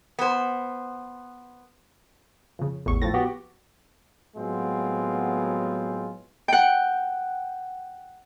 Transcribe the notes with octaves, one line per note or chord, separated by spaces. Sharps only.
B3 C5
F2 C#3
A1 E2 C#6
A2 F3 A6 A#6
B3 F#4 G4
A2 F#3 G#3 B3 C4 F4
F#5 G5